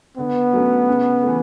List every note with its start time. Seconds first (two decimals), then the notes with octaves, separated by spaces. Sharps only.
0.18 D3 B3
0.53 F#3 A3 C#4
0.88 C#3
1.22 E3 A3